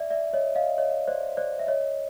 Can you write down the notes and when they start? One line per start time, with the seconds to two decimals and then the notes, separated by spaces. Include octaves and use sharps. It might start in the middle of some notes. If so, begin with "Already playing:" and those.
Already playing: D5 E5
0.10 D5 E5
0.33 C#5 D#5
0.56 D#5 F5
0.78 C#5 D#5
1.08 C5 D5
1.37 C5 D5
1.59 E5
1.67 C#5 D#5